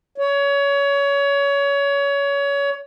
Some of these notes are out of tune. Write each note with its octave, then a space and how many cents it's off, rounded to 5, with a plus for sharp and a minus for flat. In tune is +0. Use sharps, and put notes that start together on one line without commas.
C#5 +25